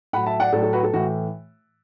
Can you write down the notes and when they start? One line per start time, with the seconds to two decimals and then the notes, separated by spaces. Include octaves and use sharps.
0.13 A2 F#3 F#5 B5
0.26 E5 A5
0.40 D5 F#5
0.53 A2 F#3 A4 D5
0.63 A4
0.73 F#4 B4
0.83 A4
0.93 A2 E3 F#4